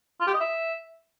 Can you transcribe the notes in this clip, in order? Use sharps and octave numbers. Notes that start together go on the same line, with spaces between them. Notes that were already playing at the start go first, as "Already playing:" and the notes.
F4
G4
D#5
E5